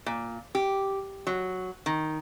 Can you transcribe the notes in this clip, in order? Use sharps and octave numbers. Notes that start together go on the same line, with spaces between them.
A#2
G4
F#3
D#3